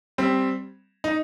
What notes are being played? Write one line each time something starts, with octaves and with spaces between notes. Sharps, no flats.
G3 C4
D#4